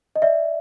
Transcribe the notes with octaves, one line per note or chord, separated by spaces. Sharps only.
D#5
D5 E5